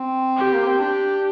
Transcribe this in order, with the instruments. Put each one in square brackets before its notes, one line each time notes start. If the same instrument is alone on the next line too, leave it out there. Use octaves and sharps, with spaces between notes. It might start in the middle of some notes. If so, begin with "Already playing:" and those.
Already playing: [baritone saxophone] C4
[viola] G4
[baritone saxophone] A#3
C4
[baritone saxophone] D4 [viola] G4